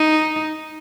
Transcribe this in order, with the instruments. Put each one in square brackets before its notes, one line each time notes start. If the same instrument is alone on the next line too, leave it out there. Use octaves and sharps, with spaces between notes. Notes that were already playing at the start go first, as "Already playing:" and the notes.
Already playing: [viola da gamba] D#4